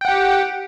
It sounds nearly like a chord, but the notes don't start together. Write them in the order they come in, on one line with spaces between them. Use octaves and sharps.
G5 F#5 G4